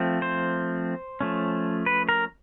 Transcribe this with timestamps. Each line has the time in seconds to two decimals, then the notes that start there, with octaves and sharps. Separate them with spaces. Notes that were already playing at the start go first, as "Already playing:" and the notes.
Already playing: F3 A3 C4
0.22 C5
1.21 F3 A3 C#4
1.86 B4
2.09 A#4